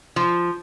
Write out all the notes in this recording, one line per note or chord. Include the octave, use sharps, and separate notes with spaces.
F3